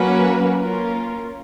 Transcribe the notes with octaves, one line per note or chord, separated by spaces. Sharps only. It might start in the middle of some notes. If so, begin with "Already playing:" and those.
Already playing: F#3 A#3 C#4 F#4 B4
A#3 C#4 F4 A#4